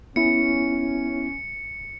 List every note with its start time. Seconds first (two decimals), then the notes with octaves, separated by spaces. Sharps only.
0.16 B3 C#4 E4 C#7